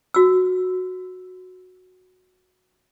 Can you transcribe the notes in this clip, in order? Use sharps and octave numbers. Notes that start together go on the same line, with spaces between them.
F#4 E6